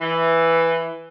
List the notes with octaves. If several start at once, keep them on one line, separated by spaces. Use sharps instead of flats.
E3